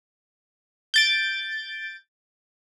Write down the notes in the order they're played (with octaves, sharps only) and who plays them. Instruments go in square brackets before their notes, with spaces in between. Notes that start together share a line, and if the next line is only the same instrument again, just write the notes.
[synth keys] G6 A6 D7